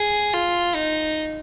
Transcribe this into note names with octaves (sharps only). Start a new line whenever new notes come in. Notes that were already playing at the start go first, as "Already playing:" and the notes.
Already playing: G#4
F4
D#4